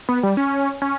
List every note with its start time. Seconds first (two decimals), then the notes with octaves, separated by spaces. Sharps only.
0.09 B3
0.23 G3
0.37 C#4
0.82 C#4